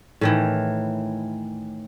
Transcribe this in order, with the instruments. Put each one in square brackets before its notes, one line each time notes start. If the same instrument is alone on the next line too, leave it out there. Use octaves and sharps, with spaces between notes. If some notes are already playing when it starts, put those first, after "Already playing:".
[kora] A2 D#3 E3